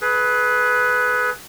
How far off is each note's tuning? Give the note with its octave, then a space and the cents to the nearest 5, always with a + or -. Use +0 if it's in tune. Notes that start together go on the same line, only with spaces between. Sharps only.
G#4 +30 B4 +0